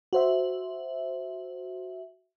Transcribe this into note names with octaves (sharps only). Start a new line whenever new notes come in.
F#4 C5 E5